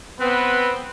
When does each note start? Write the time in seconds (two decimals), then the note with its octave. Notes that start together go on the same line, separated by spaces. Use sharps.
0.19 B3 C4 B4